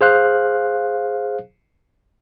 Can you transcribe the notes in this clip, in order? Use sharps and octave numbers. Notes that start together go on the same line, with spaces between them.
G#4 C5 F5 F#6